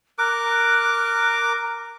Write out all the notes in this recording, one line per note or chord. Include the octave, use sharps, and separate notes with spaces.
A#4 D6 F#6